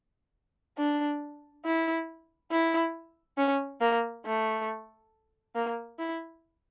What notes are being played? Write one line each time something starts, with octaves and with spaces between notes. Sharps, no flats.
D4
E4
E4
C#4
A#3
A3
A#3
E4